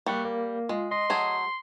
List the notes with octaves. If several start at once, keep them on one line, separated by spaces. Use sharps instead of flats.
G3 A#3 C#6 F#6
A#3
G#3 F4
D#5 C6
F#3 A3 G#4